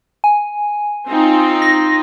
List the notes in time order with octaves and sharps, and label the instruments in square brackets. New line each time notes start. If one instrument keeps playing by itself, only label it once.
[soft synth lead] G#5
[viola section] C4 D#4 F4
[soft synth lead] A#6